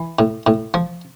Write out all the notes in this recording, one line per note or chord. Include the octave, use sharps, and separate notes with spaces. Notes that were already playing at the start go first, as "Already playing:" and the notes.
Already playing: E3
A2
A2
F3